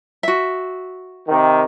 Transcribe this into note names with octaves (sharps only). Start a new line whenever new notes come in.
F#4 E5
C3 D#3